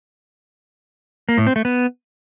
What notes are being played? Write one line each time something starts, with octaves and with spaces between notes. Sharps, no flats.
A#3
A2
C4
A3
B3